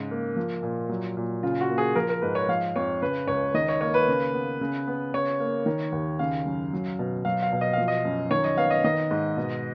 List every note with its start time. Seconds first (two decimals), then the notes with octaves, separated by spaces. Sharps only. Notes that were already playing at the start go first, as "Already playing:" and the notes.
Already playing: G#2 C#3
0.11 A#3
0.36 F3
0.63 A#2
0.89 F#3
1.17 A#2
1.43 C#3 F4
1.61 F#4
1.70 A#3
1.78 G#4
1.95 F3 A#4
2.09 A#4
2.22 G#2 B4
2.35 C#5
2.48 F3 F5
2.76 F2 C#5
3.02 C#3 B4
3.27 C#2 C#5
3.54 D#3 D#5
3.68 C#5
3.81 A#3 C#5
3.94 B4
4.08 C#3
4.34 B3
4.61 C#3
4.87 B3
5.14 C#3 C#5
5.40 A#3
5.66 D#3
5.92 D#2
6.19 C#3 F5
6.46 F#2
6.73 F#3
6.99 B2
7.25 F#3 F5
7.43 F5
7.52 B2
7.61 D#5
7.73 F3 F5
7.88 D#5
8.05 F#2
8.31 D#3 C#5
8.44 D#5
8.57 B3 F5
8.70 D#5
8.84 D#3 D#5
9.11 G#2
9.37 B2